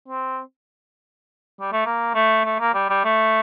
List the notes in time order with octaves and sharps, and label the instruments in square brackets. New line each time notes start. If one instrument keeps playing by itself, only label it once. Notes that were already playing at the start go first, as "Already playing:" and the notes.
[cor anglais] C4
G3
A3
A#3
A3
A3
A#3
G3
G3
A3